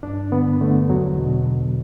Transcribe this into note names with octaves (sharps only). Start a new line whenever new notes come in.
G2 D4
D3 B3
D3 A3
E2 F#3
B2